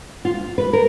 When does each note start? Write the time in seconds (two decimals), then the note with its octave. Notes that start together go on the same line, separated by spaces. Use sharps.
0.25 F4
0.58 B4
0.73 A#4